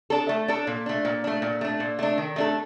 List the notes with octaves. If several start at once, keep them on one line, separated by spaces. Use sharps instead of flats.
D4 A4
A3
D4 A4
A#2
A3 D4
A#2
A3 D4
A#2
A3 D4
A#2
A3 D4
D#3
A3 D4 A4